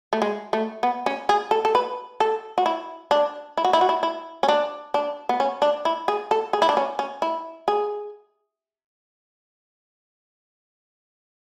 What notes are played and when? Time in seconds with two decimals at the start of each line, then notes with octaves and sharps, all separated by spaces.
0.13 A3
0.22 G#3
0.53 A3
0.83 B3
1.06 C#4
1.29 G#4
1.51 A4
1.65 A4
1.75 B4
2.20 A4
2.58 F#4
2.66 E4
3.11 D4
3.57 E4
3.64 F#4
3.73 E4
3.81 F#4
3.89 E4
4.03 E4
4.43 C#4
4.48 D4
4.94 D4
5.29 B3
5.40 C#4
5.62 D4
5.85 E4
6.08 G#4
6.31 A4
6.53 G#4
6.62 E4
6.69 D4
6.77 C#4
6.99 C#4
7.22 E4
7.68 G#4